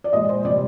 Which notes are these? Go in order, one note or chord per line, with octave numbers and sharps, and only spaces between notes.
D5
A#2 G#3 D#5
C5
C3 G3 D5